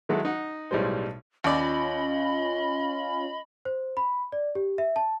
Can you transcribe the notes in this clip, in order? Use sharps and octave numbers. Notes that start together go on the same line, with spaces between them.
D#3 F#3 G#3 E4 F#4 A4
D#4 F#5
B1 A2 G3 G#3 C5
D#2 C#4 F4 D5 D#5 B5
C5
B5
D5
G4
E5
A5